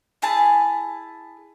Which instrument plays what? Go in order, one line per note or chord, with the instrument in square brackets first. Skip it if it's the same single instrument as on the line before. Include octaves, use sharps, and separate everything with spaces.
[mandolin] E4 G#4 A5